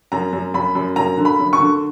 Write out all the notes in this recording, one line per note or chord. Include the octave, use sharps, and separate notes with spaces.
F#2 A#5
F#2
F#2 B5
F#2
F#2 A#5
D3
B5
F#2
C#6
D3